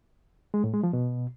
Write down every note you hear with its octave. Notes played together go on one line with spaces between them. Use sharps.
G#3
A2
G#3
F3
B2